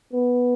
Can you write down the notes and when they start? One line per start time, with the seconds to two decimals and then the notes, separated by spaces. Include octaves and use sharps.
0.13 B3